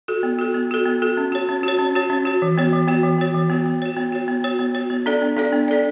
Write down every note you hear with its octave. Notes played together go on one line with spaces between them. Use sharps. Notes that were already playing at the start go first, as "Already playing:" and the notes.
F#4 A4
B3
F#4 A4
B3
F#4 A4
B3
F#4 A4
C#4
F#4 C#5
C#4
F#4 C#5
C#4
F#4 C#5
C#4
F#4 C#5
E3
B3 F#4 C#5
E3
B3 F#4 C#5
E3
B3 F#4 C#5
E3
B3 F#4 C#5
B3
F#4 C#5
B3
F#4 C#5
B3
F#4 C#5
B3
F#4 C#5
B3
D4 A4 D5
B3
D4 A4 D5
B3
D4 A4 D5